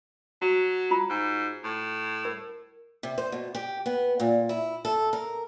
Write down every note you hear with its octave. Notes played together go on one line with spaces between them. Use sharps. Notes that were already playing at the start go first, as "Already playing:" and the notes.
F#3 F#4
F4 A#5 B5
G#2
A2
A#4
C3
C5
B2
G4
B3
A#2
E4
A4
A#4